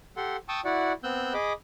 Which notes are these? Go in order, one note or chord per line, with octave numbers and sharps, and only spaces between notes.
G4 A4 F#5 C6
G5 A5 C#6 D#6 E6
E4 F#4 D5 F#5
B3 C4 E6 F#6 G6
G#4 D#5 B5 D6